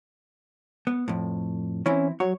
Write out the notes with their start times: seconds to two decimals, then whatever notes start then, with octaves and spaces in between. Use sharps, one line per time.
0.87 B3
1.08 F2 A2
1.86 E3 C4 C#4 E4
2.20 F#3 C#5